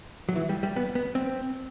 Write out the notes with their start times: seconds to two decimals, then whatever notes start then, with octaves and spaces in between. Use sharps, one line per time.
0.29 F#3
0.36 E3
0.49 G3
0.63 G3
0.76 B3
0.95 B3
1.15 C4